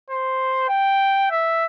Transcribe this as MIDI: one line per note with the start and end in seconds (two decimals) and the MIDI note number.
0.10 0.67 72
0.69 1.28 79
1.31 1.66 76